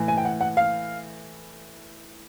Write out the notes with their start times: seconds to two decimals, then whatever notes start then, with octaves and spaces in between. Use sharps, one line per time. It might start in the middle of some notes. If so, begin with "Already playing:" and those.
Already playing: A2 E3
0.08 G#5
0.17 G5
0.25 F#5
0.41 F#5
0.57 F5